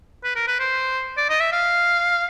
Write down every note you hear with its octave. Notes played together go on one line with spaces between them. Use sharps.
B4
A#4
B4
C5
D5
D#5
E5
F5